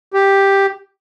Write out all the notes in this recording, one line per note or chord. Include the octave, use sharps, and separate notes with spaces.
G4